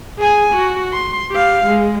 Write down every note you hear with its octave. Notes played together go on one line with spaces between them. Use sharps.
G#4 G#5
F#4
C6
G4 F5
G#3